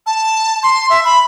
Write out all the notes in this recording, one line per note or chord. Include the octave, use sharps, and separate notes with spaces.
A5
C6
E5
B5